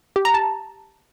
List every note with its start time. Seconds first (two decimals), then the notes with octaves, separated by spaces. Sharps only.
0.16 G4
0.25 A#5
0.34 A5